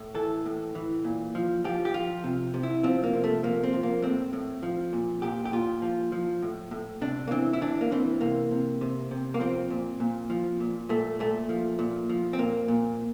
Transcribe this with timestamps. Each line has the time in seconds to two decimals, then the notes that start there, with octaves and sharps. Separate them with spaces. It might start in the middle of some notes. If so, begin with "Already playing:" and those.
Already playing: A2
0.15 E3 A4
0.46 A2
0.75 E3
1.05 A#2
1.35 F3
1.64 F3 G4
1.85 G4
1.94 F3 F4
2.24 C3
2.54 C3
2.63 E4
2.83 F3 C4
3.04 A#3
3.13 C3
3.24 A3
3.43 F3 A#3
3.63 C4
3.73 F3
3.83 A#3
4.02 A2 C4
4.33 A2
4.63 F3
4.93 A#2
5.22 A#2 G4
5.45 G4
5.52 A#2 F4
5.82 F3
6.12 F3
6.42 A2
6.71 A2
7.01 C3 D4
7.28 A#3
7.31 E3 C4
7.53 E4
7.61 E3 D4
7.81 A#3
7.91 E3 C4
8.21 C3 A#3
8.51 C3
8.81 C3
9.11 C3
9.34 A#3
9.40 F3 C4
9.70 A#2
10.00 A#2
10.30 F3
10.60 A#2
10.89 A#2 A3
11.20 A#2 A3
11.49 F3
11.79 A#2
12.09 F3
12.33 C4
12.39 A#2 A#3
12.68 A#2